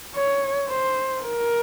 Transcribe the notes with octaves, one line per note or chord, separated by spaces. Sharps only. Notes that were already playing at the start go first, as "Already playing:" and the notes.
C#5
C5
A#4